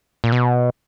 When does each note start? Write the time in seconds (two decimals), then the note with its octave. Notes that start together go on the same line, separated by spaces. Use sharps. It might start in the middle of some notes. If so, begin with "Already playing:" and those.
0.24 A#2
0.32 B2